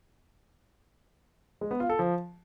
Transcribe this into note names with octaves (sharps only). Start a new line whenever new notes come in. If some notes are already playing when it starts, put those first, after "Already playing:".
G#3
B3
F4
A4
F3